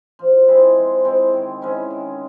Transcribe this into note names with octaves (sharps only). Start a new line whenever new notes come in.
F3
G#3 C4 E4
F3
G#3 C4 E4
D#3
G#3 C#4 E4
D#3